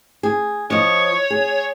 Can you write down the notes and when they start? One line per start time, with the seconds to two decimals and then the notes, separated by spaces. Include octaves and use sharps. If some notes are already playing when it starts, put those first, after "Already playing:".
0.23 G#4
0.70 F3 C#5 D#5
1.30 G#4